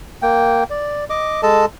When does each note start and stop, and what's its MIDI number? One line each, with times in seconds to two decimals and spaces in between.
0.22 0.64 58
0.22 0.64 79
0.70 1.05 74
1.10 1.41 75
1.10 1.41 86
1.43 1.66 56
1.43 1.66 69
1.43 1.66 75
1.43 1.66 81